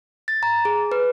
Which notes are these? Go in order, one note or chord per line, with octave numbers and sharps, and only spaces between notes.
A6
A#5
G#4
B4